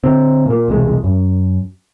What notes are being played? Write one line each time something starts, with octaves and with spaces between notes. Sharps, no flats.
D3 C4
A#2 A#3
E1 C2 G#3
F#2